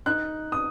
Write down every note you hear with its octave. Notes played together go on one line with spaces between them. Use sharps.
D#4 F#6
D#6